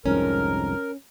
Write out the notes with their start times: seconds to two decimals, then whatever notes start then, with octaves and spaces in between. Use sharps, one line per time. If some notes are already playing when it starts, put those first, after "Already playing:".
0.06 C2 F2 G#2 C#4 A#4